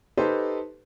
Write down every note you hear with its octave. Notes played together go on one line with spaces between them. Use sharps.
D#4 G4 A4 B4 C5 C6